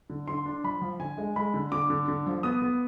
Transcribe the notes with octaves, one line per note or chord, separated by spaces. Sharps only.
D3
D3 C6
D4
F3 B5
F3
D3 G#5
G#3
G#3 B5
D3
D3 D6
D3
D3
F3
B3 D#6
B3